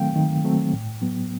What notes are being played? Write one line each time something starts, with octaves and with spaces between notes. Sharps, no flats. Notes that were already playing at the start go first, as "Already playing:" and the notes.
Already playing: D#3 F#3 A3 C4 F5 G5
D#3
F#3 A3 C4
A2
F#3 B3